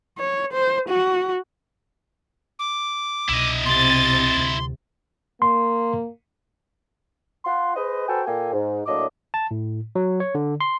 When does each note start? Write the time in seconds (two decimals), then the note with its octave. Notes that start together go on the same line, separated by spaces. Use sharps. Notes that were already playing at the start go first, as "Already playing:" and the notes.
0.18 C#5
0.53 C5
0.89 F#4
2.59 D6
3.29 C2 B2 E4 D#5
3.66 C3 C6 A6
4.36 D2 C3
5.42 A#3 C6
7.45 F4 F#5 C6
7.74 G#4 B4 C5 D#5
8.08 F#4 A4 B4 C5 G5 G#5
8.26 A#2 A#3 A4 G5 G#5
8.53 G#2
8.86 A2 F#3 A#3 D4 D#5 D6
9.34 A5
9.51 A2
9.95 F#3
10.20 C#5
10.35 D3
10.61 C6